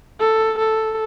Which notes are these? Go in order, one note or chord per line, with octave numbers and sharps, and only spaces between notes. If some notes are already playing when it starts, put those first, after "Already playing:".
A4
A4